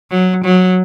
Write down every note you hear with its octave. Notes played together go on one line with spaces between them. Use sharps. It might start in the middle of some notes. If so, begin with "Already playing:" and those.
F#3
F#3